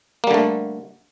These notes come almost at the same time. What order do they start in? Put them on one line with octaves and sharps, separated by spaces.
A#3 G3 D3 A3